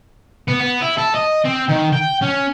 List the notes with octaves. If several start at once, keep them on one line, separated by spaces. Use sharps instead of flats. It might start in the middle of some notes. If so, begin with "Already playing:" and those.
B3
B3
E4
A4
D#5
C4
D#3
G5
C#4